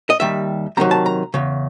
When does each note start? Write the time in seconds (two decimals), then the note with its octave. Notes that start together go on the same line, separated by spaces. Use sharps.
0.10 D#5
0.20 D#2 D#3 G3 E5
0.77 F2 C3 D#3 F#3 A#5
0.91 A5
1.06 A#5
1.34 E2 C#3